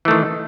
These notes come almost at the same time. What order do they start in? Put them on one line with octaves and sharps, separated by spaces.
E3 A3 D#3